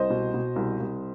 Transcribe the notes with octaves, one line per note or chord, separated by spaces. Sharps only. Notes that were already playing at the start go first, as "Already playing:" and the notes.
Already playing: C2 C5 D#5
B2
B2
C2
C2